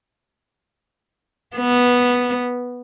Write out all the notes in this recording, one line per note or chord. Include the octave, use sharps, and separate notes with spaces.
B3